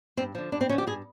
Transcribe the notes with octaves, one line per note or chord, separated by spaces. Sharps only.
G2 C4
D3 F3
G2 D4
C4
D3 F3 C#4
G4
G2 G#4